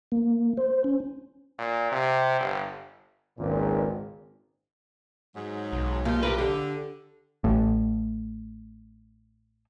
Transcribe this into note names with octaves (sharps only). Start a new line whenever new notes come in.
A#3
C5
C#4
A#2
C3
G1
G#1 C#2 A#2
G#2 F#3
B1
A#2 F3 G3 F4
G4 A#4 B4
D3 G4
A1 A2